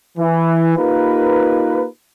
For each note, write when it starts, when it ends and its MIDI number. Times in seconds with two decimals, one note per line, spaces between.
0.18 0.73 52
0.77 1.85 58
0.77 1.85 63
0.77 1.85 65
0.77 1.85 67
0.77 1.85 70
0.77 1.85 71